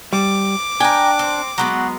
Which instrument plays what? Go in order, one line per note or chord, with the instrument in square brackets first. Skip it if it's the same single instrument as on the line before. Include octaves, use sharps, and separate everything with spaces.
[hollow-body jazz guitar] G3 [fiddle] D6
[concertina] D4 [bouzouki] A#4 G5 [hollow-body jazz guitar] G#5
[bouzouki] C4
[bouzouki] F#3 G#3 B3 [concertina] F#4